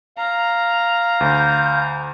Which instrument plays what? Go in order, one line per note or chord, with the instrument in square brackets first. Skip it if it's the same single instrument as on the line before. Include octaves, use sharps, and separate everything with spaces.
[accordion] F5 [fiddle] A#5
[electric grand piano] D2 [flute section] G6